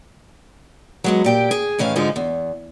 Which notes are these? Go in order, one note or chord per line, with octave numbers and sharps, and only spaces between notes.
F#3 G#3 B3
A#2 G4 G5
G#4
A2 D#3 E3 C#4 F5
G#2 D3 F3 G#3 D#4 G#4
E2